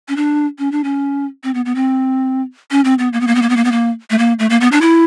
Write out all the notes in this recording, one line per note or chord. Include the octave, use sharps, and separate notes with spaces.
C#4
D4
C#4
D4
C#4
C4
B3
B3
C4
C#4
C4
B3
A#3
B3
A#3
B3
A#3
B3
A#3
B3
A#3
A3
A#3
A3
A#3
B3
D4
E4